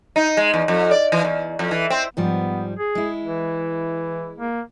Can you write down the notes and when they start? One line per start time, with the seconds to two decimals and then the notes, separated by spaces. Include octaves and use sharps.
0.16 D#4
0.37 G#3
0.54 E2
0.68 F2
0.91 D5
1.12 E3
1.25 E2
1.59 F2
1.71 E3
1.90 C4
2.17 G#2 F3 G3 B3
2.79 G#4
2.95 G#3 E4
3.24 E3
4.38 A#3